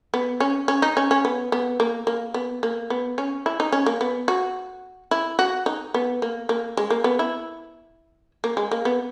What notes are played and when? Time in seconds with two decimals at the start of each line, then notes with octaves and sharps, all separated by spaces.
0.14 B3
0.40 C#4
0.68 C#4
0.82 D#4
0.97 C#4
1.11 C#4
1.25 B3
1.52 B3
1.80 A#3
2.07 A#3
2.34 B3
2.63 A#3
2.90 B3
3.18 C#4
3.46 E4
3.60 D#4
3.72 C#4
3.86 A#3
4.01 B3
4.28 F#4
5.11 E4
5.39 F#4
5.66 D#4
5.94 B3
6.22 A#3
6.49 A#3
6.77 G#3
6.90 A#3
7.04 B3
7.19 E4
8.44 A#3
8.57 G#3
8.71 A#3
8.85 B3